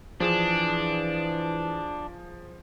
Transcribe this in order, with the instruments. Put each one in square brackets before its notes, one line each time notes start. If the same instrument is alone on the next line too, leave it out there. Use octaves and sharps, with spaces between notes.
[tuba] E3 [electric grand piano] F3 G#4 [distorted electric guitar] D4